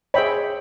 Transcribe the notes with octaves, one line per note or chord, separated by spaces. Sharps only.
G#4 C5 C#5 E5 G5 B5